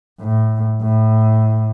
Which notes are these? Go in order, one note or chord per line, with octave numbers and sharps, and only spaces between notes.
A2
A2